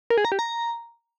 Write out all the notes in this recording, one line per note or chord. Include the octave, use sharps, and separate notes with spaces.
A#4
G#4
A#5
G4
A#5